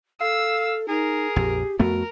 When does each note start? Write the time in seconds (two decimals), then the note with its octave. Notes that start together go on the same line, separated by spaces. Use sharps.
0.21 A4 F5 E6
0.88 D#4 G#4 A#4
1.36 A#1 F2 G4
1.79 F2 A3 B3 F#4 A#4